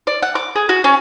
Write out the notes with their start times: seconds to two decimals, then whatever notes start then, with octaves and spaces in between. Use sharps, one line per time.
0.07 D5
0.22 F#5
0.35 D6
0.56 G#4
0.69 F#4
0.84 C#4